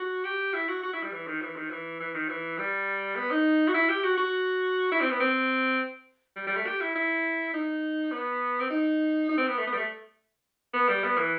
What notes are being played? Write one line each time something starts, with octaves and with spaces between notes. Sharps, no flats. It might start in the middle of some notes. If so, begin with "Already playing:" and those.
Already playing: F#4
G4
E4
F#4
F#4
E4
G3
E3
D#3
E3
D#3
E3
E3
D#3
E3
G3
B3
D#4
F#4
E4
G4
F#4
F#4
E4
C4
B3
C4
G3
G3
A3
G4
E4
E4
D#4
B3
C4
D#4
D#4
C4
B3
A3
B3
G3
A3
B3
G3
B3
E3